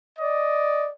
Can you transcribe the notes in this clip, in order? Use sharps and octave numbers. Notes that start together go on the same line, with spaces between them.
D5 D#5